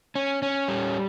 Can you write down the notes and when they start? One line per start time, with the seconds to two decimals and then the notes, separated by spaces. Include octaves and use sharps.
0.15 C#4
0.42 C#4
0.68 G3